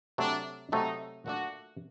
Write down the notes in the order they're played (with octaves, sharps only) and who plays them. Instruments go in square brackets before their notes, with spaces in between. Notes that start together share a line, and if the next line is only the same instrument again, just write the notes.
[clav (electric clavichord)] C3 F#3 A3 [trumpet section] D4
[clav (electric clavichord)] C3 F#3 A3 [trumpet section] D#4
[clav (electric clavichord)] A#2 A3 D4 [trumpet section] F#4